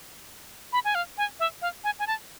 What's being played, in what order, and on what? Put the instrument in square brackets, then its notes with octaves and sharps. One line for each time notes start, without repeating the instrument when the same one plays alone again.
[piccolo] B5
G#5
F5
G#5
E5
F5
G#5
G#5
A5